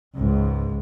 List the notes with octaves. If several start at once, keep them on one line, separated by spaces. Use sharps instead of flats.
C#2 G#2